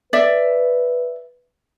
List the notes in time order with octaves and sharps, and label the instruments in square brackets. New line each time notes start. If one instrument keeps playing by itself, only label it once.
[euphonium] B4 [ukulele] D5 E5